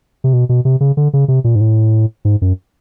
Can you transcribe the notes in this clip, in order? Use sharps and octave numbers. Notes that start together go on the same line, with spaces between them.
C3
B2
B2
C3
C#3
D3
C#3
C3
A#2
G#2
A2
G#2
F#2